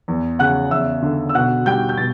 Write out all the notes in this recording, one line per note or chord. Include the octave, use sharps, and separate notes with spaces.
E2
C#3 F#5 F#6
E2 E5 E6
D3
E6
B2 F#5 F#6
G3 G5 G6
G6
B2 A6